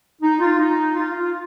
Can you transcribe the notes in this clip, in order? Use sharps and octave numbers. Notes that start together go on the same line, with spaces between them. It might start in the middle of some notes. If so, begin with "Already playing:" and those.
D#4
F4
D#4
F4
F4